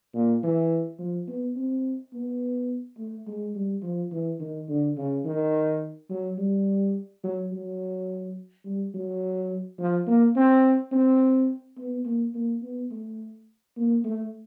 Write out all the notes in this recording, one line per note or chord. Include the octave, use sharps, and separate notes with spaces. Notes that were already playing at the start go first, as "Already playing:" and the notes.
A#2
E3
F3
B3
C4
B3
A3
G#3
G3
F3
E3
D#3
D3
C#3
D#3
F#3
G3
F#3
F#3
G3
F#3
F3
A#3
C4
C4
B3
A#3
A#3
B3
A3
A#3
A3